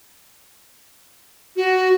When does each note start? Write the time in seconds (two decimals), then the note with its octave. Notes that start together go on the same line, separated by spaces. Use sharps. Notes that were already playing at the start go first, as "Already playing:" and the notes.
1.56 F#4